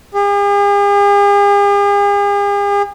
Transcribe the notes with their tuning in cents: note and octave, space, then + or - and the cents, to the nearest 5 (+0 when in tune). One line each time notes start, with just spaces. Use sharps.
G#4 -45